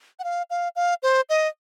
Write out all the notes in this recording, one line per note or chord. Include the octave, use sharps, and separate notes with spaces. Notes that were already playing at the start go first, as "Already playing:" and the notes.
F#5
F5
F5
F5
C5
D#5